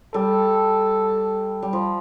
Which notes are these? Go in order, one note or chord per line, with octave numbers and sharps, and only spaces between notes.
G3 A4
G3
F3